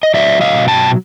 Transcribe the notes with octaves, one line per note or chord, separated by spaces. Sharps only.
D#5
F#3 D5 E5
D#5 F5
B2
G5 A5